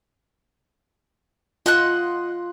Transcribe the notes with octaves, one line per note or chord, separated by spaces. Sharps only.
F4 D#5 F#5 F#6